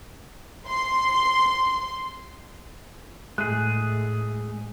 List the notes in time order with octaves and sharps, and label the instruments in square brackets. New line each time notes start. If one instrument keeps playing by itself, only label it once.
[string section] C6
[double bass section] A2 [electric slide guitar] G#3 A3 G#4 [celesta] F#6